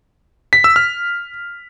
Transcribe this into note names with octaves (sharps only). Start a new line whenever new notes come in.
B6
E6
F6